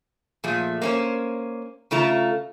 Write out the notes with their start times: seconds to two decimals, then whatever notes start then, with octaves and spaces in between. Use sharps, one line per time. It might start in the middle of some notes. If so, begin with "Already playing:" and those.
0.44 A#2 F3 A3 G#4
0.82 A#3 C#4 C5
1.91 C#3 A3 F4 A#5